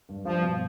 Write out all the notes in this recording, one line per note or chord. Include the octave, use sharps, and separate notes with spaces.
G2
G2 F3
B2